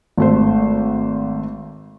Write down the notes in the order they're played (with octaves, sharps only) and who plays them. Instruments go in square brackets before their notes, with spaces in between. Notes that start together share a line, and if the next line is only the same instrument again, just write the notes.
[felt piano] G#1 A3 C5